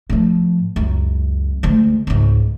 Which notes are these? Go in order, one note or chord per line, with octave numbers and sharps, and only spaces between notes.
A2 F3
C#2 F#2
D2 G#3
C#2 G#2